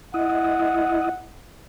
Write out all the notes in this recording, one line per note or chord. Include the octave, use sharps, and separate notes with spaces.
E4 D#5 F#5